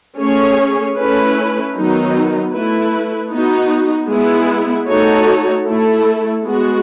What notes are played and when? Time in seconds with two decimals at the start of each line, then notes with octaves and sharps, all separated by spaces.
0.18 A3 C#4 G#4 C#5
0.97 A3 C#4 E4 B4
1.75 D#3 F#3 B3 D#4
2.53 A3 E4 B4
3.31 B3 D#4 F#4
4.09 G#3 B3 E4
4.86 A3 D#4 F#4 A4 C#5
5.65 A3 E4 A4
6.43 G#3 B3 F#4